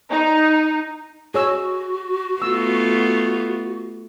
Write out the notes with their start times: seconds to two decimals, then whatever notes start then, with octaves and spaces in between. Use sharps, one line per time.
0.10 D#4
1.34 F#4 G#4 C#5 E6
2.42 A3 B3 F4 E6